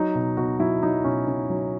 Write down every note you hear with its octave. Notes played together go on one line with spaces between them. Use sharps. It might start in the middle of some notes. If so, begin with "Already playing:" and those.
Already playing: F#3 D#4
B2
B2 F#4
F#3 E4
F#3 D#4
B2 C#4
B2 C#4
F#3